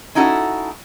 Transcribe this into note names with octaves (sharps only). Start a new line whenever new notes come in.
C#4 D#4 E4 F#4 A4